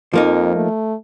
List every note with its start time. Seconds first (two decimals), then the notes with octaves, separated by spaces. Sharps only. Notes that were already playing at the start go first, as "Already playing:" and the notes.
0.13 F2 F3 A#3 D#4
0.56 A3